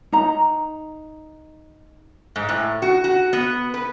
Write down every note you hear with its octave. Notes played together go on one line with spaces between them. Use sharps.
D#4 A#5
G#2
A2
F#4
F#4
B3
B4